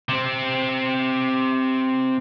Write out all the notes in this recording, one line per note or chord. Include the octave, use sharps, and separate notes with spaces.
C3 C4